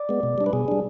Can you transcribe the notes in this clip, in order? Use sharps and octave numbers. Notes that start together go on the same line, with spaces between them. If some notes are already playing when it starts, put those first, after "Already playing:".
Already playing: D5
G#3 B3
B2
G3 D4
B4
B2 G#4
G3 D4